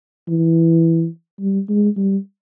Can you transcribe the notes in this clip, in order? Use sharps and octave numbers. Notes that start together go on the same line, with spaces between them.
E3
G3
G#3
G3